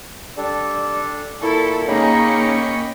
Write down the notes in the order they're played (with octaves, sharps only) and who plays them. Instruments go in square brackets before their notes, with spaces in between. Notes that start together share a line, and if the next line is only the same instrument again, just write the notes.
[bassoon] G3 [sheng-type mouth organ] D4 A4
[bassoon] A#2 [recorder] E4 [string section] A4 [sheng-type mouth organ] C#6
[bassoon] C#3 [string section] A#3 C#4 C#7 [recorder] D#4 [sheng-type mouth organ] D#5 G5 B5